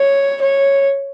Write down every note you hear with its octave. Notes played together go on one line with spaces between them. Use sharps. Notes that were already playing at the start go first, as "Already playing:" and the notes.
Already playing: C#5
C#5